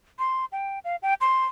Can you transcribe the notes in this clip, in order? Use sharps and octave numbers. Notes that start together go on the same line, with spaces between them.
C6
G5
F5
G5
C6